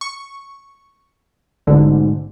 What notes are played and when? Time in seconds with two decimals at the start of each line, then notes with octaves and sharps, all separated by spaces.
0.01 C#6
1.67 A1 G#2 B2 D3